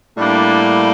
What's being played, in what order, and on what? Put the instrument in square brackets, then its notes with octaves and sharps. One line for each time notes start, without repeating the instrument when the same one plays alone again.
[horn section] A2 G3 A#3 D4 D5